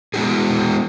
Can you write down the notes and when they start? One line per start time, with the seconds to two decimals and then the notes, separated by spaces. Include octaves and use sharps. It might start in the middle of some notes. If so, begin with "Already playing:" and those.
0.14 G#3 B3 E4 F#4 G#4